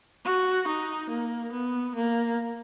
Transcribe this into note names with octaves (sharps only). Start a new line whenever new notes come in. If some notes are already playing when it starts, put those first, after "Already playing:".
F#4
D#4
A#3
B3
A#3